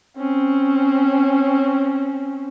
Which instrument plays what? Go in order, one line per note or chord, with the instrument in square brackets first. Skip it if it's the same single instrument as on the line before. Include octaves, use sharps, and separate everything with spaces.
[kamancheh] C4 C#4